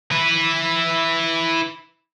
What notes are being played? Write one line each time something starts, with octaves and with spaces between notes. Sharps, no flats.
E4 B4